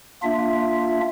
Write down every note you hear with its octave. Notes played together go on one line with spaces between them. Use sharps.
A#3 D4 F4 E5